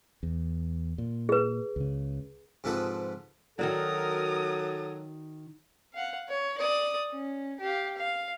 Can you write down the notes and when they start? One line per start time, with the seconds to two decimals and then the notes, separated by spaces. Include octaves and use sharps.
0.23 E2
0.98 A#2
1.29 G#4 B4
1.76 C#2 C#3
2.64 G#2 C3 F3 A4 B4 D#6
3.59 D#3 F#3 F#4 A4 A#4 D5 D#6
5.93 F5 F#5
6.28 C#5
6.58 D5 D#6
7.11 C#4
7.59 G4 F5
7.96 F5